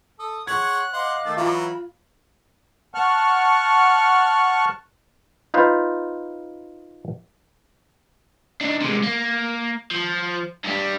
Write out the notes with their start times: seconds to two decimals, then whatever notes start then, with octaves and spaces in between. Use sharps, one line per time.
0.19 A4 D#6
0.47 G#4 C#5 F#5 C6 F#6 G#6
0.93 C5 D#5 F5 F#5 D6
1.25 D#3 A3 A6
1.37 E3 F#3 F4 A#5 B5
2.94 F#5 A5 C#6 F6 F#6
5.54 D#4 F4 B4 C5
8.61 D4 D#4
8.81 C3 G#3
9.03 A#3
9.91 F3
10.65 G2 G3